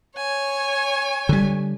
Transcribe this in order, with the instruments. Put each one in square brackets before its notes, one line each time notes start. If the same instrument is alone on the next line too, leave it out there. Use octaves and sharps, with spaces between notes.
[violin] C#5 G#5
[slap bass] D3 G3